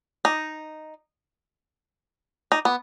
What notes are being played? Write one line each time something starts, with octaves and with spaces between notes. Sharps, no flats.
D#4
D#4
B3